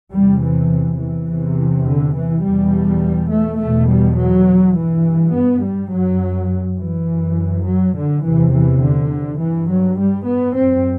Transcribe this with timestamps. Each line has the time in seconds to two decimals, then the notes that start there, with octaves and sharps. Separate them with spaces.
0.13 E2 C3 G3
0.42 E3
1.00 E3
1.29 E2 C3
1.87 D3
2.16 E3
2.45 E2 B2 G3
3.32 A3
3.61 E2 B2 A3
3.90 G3
4.18 F#3
4.77 G2 E3
5.34 B3
5.64 G3
5.92 F#2 F#3
6.79 E3
7.09 F#2
7.67 F#3
7.96 D3
8.24 E2 C3 E3
8.54 E3
8.83 D3
9.40 G2 E3
9.69 F#3
9.98 G3
10.27 B3
10.56 F#2 C4